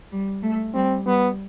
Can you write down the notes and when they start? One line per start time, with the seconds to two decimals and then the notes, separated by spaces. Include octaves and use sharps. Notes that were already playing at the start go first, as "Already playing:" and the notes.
0.12 G3
0.43 A3
0.74 G3 C4
1.06 G3 B3